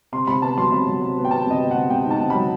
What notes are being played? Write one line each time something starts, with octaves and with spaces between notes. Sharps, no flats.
C3 C6
C3 B5
B3 A5
F#3 C6
C3 B5
F#3
C3
B3
G5
B3 A5
C3 D#5
B3
C3 F#5
C3 G5
D#4 A5
C3
F#3 B5